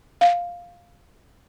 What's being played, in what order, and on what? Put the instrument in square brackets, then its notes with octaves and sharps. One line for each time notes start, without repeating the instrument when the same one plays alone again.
[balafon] F5